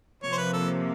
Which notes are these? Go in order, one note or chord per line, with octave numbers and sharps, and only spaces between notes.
C3 F3 A#3 C#5
C5
B4
A4